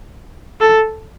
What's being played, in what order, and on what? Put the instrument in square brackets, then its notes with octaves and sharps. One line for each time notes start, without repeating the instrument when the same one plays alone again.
[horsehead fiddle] A4